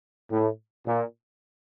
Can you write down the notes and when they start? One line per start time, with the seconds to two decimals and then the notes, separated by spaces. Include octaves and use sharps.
0.32 A2
0.87 A#2